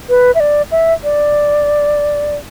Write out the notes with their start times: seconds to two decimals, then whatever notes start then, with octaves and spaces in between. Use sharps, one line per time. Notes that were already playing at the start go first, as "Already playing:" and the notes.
0.09 B4
0.35 E5
0.40 D5
0.71 E5
1.04 D5